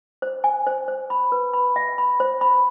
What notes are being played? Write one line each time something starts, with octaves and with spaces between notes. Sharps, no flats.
C5
G#5
C5
C5
B5
B4
B5
E5
B5
C5
B5